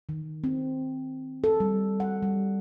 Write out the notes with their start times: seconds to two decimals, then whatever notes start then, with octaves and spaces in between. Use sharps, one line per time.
0.09 D#3
0.44 C4
1.44 A4
1.60 G3
2.00 F#5
2.23 G3